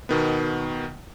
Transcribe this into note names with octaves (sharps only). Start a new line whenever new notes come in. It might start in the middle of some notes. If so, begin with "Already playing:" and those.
B2 D#3 B3